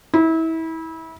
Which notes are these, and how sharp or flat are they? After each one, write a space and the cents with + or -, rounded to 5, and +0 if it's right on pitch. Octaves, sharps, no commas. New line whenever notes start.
E4 -30